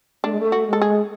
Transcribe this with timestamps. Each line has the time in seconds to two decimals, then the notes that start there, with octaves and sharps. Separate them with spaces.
0.24 A3 D4
0.32 G#3
0.39 A3
0.52 F#4
0.67 G#3
0.73 A4
0.82 G#4